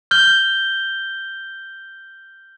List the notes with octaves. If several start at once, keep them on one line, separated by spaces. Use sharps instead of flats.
F6 G6 G7